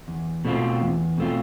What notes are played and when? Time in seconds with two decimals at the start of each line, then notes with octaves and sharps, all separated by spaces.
0.08 E2
0.45 B2 A3 C4 F4
0.82 E2
1.18 B2 A3 C4 F4